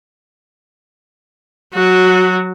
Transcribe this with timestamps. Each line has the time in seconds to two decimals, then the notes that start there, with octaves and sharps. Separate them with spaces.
1.74 F#3 F#4